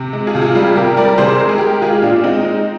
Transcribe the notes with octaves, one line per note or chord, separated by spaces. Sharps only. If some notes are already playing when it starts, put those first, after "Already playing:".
Already playing: C3
G#3
F4 G#4
C3
F4 G#4
G3 F4 G#4
C3 G4 A#4
G3 A#4 D5
A#4
C3 G#4 C5
G#3 A#4
G#4
G#3 G4 A#4
G#3 F4 G#4
G4
A#2 D4 F4
G#3 C4 D#4
G#3